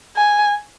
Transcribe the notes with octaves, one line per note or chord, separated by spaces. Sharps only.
G#5